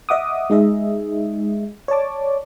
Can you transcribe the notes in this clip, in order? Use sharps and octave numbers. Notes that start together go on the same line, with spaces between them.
D#5 E5 F#5 D6 D#6
G#3 D#4 G#4 D#5 E5
C#5 D5 A5 D6